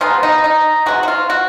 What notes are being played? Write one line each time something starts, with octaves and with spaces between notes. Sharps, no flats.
F3 G#3 B3 D#4 F4
D#4
D#4
C3 F3 G#3 F#4
F#4
F4
F#4